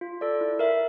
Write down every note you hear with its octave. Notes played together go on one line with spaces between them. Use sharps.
F4
A4 D5
E4
A#4 E5